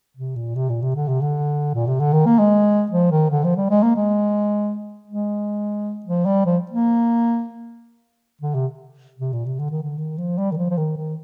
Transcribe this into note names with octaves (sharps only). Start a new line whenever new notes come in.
C3
A#2
C3
A#2
C3
D3
C3
D3
A#2
C3
D3
D#3
A#3
G#3
F3
D#3
D3
F3
G3
G#3
A#3
G#3
G#3
F3
G3
F3
A#3
D3
C3
C3
A#2
C3
D3
D#3
D3
D#3
F3
G3
D#3
F3
F3
D#3
D#3